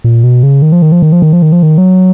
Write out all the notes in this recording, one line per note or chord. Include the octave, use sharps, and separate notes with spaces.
A#2
B2
C#3
D#3
F3
D#3
F3
D#3
F3
D#3
F3
D#3
F3
D#3
F#3